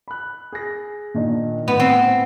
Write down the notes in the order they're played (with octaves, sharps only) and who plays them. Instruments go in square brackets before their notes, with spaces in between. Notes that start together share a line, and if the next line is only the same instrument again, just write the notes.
[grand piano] B5 F#6
G#4 A#6
A#2 D#3 D4
[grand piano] A2 [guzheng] B3
[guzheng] C4